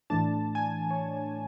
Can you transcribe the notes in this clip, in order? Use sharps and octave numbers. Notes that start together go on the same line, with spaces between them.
A2 E3 A3 D4 A5
G#5
C#5